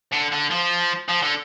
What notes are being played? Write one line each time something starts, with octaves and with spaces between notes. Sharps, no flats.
D3
D3
F3
F3
D3